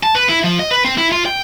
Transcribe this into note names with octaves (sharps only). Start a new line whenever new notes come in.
A5
B4
E4
F3
D#5
B4
C4
E4
F4
G5